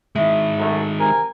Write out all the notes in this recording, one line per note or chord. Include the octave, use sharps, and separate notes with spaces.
D#3 G#3 E4
F#2 A3
C3 A#4 G#5